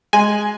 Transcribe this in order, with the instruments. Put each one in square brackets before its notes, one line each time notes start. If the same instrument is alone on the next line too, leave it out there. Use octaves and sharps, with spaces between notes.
[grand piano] G#3 [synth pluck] G#5